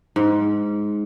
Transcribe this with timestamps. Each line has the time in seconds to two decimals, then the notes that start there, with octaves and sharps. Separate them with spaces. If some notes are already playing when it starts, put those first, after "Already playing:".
0.16 G#2